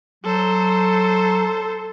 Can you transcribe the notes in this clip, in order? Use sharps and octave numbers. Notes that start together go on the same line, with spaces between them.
F#3 A4 C5